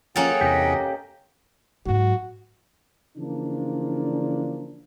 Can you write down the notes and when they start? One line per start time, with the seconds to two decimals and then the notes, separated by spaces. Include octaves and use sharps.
0.16 F3 A#3 C#4 G#4 A4 F#5 G5
0.41 E2 C3 G4 D#5
1.86 G#2 F#3 F#4
3.17 C#3 E3 F3 A#3 D4